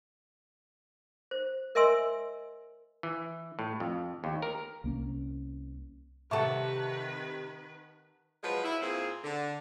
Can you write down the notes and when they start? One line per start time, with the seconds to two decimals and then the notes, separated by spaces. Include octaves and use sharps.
1.31 C5
1.75 A#4 D#5 E5 G#5 C6 E6
3.03 E3
3.59 A2
3.80 F2
4.24 D#2
4.42 A#4
4.84 C2 A#3 C#4
6.31 C3 D#3 A4 B4 E5 F#5 A5 C#6
8.44 F3 F#3 G#3 B4
8.64 E4
8.82 A#2 C4 F4 G#4
9.24 D3